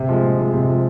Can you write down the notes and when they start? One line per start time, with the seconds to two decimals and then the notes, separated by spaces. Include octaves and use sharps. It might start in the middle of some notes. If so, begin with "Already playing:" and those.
Already playing: C3
0.09 F3 G#3
0.24 C3
0.38 F3 G#3
0.53 C3
0.69 F3 G#3